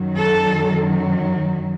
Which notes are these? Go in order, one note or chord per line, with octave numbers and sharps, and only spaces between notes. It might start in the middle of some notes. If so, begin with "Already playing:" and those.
Already playing: F#2 D#3 F#3
A4